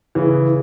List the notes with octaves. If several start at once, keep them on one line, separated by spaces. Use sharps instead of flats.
C#3 E3